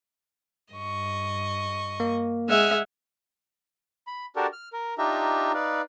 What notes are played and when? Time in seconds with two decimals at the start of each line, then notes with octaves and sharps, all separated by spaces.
0.73 G2 D#5 C#6
2.00 A#3
2.49 G#3 E5 F#5 G#5 F6
4.07 B5
4.36 D4 F#4 G4 A4 A#4 D5
4.53 F6
4.73 A#4
4.98 D4 D#4 F4 G4 E5 A#5
5.54 D#4 B4 D5 F5